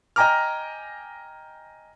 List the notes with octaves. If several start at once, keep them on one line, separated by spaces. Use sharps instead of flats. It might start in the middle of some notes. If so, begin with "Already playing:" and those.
D#5 G5 G#5 A#5 D6 F6